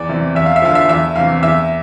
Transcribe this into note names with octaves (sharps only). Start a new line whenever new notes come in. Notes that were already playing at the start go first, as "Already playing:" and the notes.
Already playing: E2 D5
C3 E3
E2 E5
F5
E5
D3 F3 F5
E5
E2 E5
C3 E3 F5
E2 E5